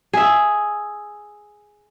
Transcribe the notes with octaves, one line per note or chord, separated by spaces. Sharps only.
G#4 E5